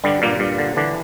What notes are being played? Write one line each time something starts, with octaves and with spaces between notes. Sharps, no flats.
G2 D3 G3
G2 A#2 A#3
G2
D3
D3 E3 D4